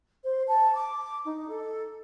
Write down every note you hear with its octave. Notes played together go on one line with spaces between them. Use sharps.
C5
A5
D6
D#4
A4